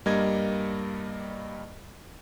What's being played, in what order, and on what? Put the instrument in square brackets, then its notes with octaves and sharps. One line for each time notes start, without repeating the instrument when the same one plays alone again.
[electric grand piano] G2 G3 A#3 A#4 D#5 G#6